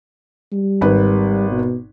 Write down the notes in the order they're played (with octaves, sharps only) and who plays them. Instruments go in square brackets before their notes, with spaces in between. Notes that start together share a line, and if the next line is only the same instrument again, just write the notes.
[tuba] G3
[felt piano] G#1 B4
[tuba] B2